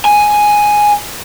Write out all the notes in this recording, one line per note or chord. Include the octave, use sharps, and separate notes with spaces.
G#5